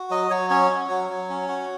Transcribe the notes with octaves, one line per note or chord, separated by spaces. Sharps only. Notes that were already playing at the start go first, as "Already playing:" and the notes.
Already playing: F#4
F#3 D#5
F#3 C#5
C#4 C#5
F#4
F#3
F#3
C#4
F#4